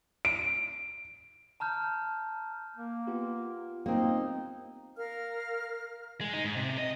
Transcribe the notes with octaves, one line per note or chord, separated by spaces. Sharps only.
D7
A5 A#5 F6 G6
A#3
B3 F4 G4
A#3 C4 D#4
A#4 F5 F6
G#3
D#4
G#2
C3
D#5